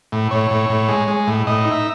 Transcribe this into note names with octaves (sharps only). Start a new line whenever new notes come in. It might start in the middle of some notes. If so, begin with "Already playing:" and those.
A2
A2 C#5
A2
A2
G#3
G#3
A2
A2 D#5
D#4
E5